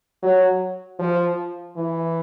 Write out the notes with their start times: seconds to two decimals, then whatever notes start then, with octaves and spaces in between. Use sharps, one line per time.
0.23 F#3
0.99 F3
1.77 E3